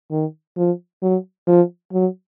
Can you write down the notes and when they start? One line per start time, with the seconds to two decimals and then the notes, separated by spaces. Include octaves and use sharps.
0.11 D#3
0.57 F3
1.02 F#3
1.47 F3
1.93 F#3